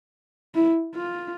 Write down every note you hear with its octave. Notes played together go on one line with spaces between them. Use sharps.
E4
F4